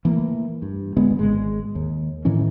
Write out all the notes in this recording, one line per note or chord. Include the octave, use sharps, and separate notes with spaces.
E3 A3 A#3
G2
D3 G#3 B3
G#1 G#3
D#2
A2 D#3 E3 C#4